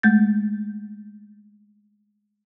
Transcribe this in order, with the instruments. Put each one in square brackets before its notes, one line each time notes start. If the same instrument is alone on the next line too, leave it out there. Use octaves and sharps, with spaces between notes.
[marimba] G#3 A3 G6 A6